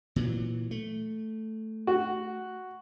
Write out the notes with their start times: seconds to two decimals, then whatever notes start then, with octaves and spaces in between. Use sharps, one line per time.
0.16 A#2 E3 F#3
0.71 A3
1.87 F#4